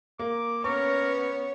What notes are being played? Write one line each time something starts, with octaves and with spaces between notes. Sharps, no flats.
A#3 D6
B3 C#4 A#4 B4 C#5 C#6